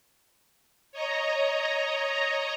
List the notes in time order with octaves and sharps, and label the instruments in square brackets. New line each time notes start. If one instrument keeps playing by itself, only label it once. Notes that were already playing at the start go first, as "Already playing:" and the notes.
[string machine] C#5 D#5 A#5